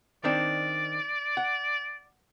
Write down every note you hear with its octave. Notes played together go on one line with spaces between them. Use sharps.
D#3 C4 D4 D5
F#5